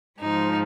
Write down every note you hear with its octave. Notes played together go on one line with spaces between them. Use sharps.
G#2 F3 D#4